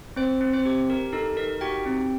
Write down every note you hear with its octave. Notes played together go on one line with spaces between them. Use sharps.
C4 C5
C4
C4 C5
G4
G4 A#4
D#4 A4
D#4 A#4
F#4 G4 G5
C4